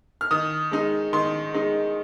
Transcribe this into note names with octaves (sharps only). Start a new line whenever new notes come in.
F6
D#3 D#6
G#3 D#4
D#3 C6
G#3 D#4